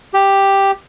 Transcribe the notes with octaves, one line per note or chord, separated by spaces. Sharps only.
G4